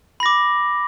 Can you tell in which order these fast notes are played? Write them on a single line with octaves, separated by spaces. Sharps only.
B5 A#6 D6